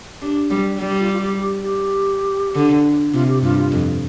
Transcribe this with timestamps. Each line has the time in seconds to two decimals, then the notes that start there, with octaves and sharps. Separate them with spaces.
0.21 D4 G4
0.50 G3
0.80 G3
0.99 F4
1.13 F4
1.19 G4
1.38 G4
1.63 G4
2.55 D3
3.13 C3 F4
3.28 G4
3.43 G2 F4
3.58 F4
3.72 F2